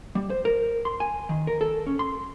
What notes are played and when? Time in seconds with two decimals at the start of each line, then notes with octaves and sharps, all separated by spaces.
0.15 G3
0.30 C5
0.45 A#4
0.85 C6
1.00 G#5
1.29 D#3
1.47 A#4
1.61 A4
1.86 C#4
1.99 C6